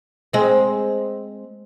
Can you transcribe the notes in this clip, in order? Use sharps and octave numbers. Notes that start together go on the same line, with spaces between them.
G#3 C4